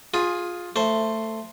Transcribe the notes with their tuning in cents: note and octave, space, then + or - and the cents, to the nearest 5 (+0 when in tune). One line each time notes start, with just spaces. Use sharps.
F4 +15 G#4 +0
A3 +10 C5 +0